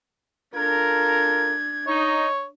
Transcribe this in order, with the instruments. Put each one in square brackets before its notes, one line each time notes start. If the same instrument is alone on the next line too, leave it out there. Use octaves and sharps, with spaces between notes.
[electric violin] D4 G#6 [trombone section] F4 A4 A#4
[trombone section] D#4 [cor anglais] C#5